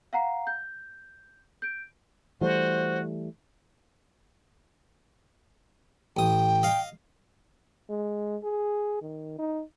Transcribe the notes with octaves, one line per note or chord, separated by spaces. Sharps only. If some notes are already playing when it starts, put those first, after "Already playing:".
F5 F#5 A#5 C7
G6
G6 D7
E3 G3 A3 F#4 C5
A1 G5 D#6
D#5 F5
G#3
G#4
D#3
D#4